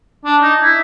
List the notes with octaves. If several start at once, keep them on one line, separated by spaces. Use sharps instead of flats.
D4
D#4
E4